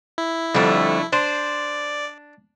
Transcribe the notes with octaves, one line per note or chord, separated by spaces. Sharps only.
E4
F2 D3 G3 A3
D4 C5 D5